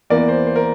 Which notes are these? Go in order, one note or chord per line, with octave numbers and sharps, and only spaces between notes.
E2 E3 A#3 A#4 D5
C5
C5
A#4